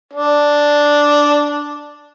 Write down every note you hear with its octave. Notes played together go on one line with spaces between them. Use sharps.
D4